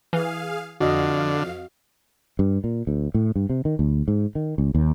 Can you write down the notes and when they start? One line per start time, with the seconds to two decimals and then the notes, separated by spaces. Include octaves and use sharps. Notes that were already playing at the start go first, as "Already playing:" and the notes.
0.13 E3 G#4 F5
0.80 F2 D3 F#4 D#5 F5
2.39 G2
2.64 A#2
2.87 D2
3.14 A2
3.36 G2
3.50 C3
3.65 D#3
3.79 D2
4.08 G#2
4.35 D#3
4.58 C#2
4.75 D#2